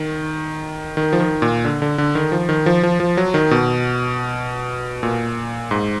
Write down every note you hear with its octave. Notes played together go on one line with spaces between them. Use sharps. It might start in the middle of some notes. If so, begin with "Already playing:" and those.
Already playing: D#3
D#3
F3
D#3
A#2
D3
D3
D3
D#3
F3
D#3
F3
F3
F3
F#3
D#3
B2
A#2
G#2